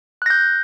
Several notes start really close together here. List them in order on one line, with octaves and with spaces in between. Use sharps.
F#6 A#6 G6